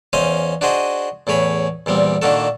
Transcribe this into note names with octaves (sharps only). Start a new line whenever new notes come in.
E2 C#4 C5 D#5 F5
D4 F#4 G#4 C5 D#5
E2 A2 G#4 C#5 B5
E2 A#2 G3 C4
A#2 D#3 A#3 D4 F#4 A4